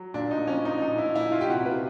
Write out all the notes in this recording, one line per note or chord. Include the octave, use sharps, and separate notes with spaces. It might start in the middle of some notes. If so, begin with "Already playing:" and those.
Already playing: F#3
A#2 D4
D#4
F3 C#4
D#4
A#2 D#4
E4
A#2 E4
F4
G4
C3 F#4
B4